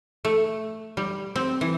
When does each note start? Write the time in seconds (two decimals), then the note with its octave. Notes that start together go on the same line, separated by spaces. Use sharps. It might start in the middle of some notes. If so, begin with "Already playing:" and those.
0.25 A3
0.97 G3
1.36 C4
1.61 E3